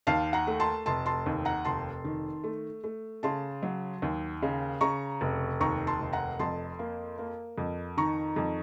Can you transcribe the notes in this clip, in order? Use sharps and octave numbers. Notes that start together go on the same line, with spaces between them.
D#2 F5 A5
F#5 A#5
A3
A5 C6
F1 A5 C6
A5 C6
D#2
F#5 A#5
F1 A5 C6
D#3
A3
A3
C#3 A5 C6
F#3
D#2
C#3
C#3 A#5 C#6
F1
D#2 A#5 C#6
A5 C6
F1
F#5 A#5
F2 A5 C6
A#3
A#3
F2
D#3 A#5 C#6
F2